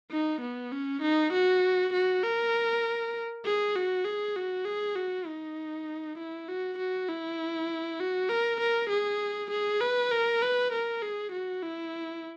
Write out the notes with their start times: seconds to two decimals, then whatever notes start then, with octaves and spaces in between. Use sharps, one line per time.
0.11 D#4
0.41 B3
0.73 C#4
1.02 D#4
1.33 F#4
1.94 F#4
2.23 A#4
3.45 G#4
3.76 F#4
4.05 G#4
4.36 F#4
4.66 G#4
4.96 F#4
5.27 D#4
6.18 E4
6.49 F#4
6.78 F#4
7.08 E4
8.00 F#4
8.29 A#4
8.60 A#4
8.90 G#4
9.51 G#4
9.81 B4
10.12 A#4
10.43 B4
10.73 A#4
11.02 G#4
11.32 F#4
11.63 E4